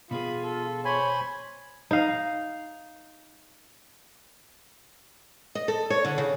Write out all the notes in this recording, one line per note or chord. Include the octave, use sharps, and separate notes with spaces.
B2 B3 F4 G#4 B5
A4
C5 C#5 G#5 B5 C6
D#4 F5
D#5
A4
C#5
D3
C#3